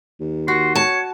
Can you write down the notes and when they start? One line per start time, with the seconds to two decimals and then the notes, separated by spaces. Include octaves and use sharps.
0.20 D#2
0.48 F#4 C6
0.75 C#5 A5